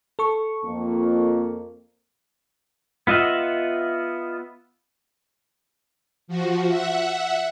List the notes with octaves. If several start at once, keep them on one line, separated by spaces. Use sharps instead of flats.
A4 C#6
F2 A#3
B3 F4 D#5 E5 F#5
F3 F#4
E5 F#5